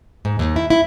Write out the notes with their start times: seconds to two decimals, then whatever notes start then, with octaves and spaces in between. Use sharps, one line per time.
0.25 G#2
0.39 D#2
0.56 E4
0.70 E4